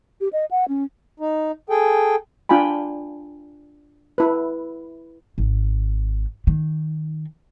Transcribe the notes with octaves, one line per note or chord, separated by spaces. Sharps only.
G4
D#5
F#5
C#4
D#4
G#4 A4 G5
D4 F4 G5 G#5 B5
E4 B4
G#1
D#3